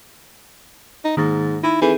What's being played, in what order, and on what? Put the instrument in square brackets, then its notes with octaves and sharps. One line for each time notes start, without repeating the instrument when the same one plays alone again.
[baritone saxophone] D#4
[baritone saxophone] G#2 [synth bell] D#3 A#3 A6
[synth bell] D#4 [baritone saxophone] E4
[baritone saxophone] E3 [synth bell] C4 G#4 A4